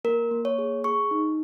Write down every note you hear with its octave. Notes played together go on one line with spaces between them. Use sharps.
A#3 A#4
A#3
C#5
G#4
G#4 C#6
D#4